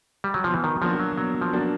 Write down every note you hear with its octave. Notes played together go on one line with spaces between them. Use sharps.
G3
F#3
B2 F3
E3
D#3
F3 F#3 A#3 D4 F#4
F#3
B2 F#3
F3
F#3 A#3 D4 F#4